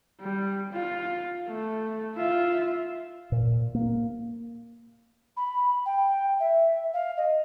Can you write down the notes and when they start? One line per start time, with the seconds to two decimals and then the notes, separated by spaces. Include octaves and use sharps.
0.20 G3
0.72 F4
1.48 A3
2.16 F4 E5
3.32 A#2
3.75 A#3
5.37 B5
5.86 G5
6.40 E5
6.94 F5
7.17 D#5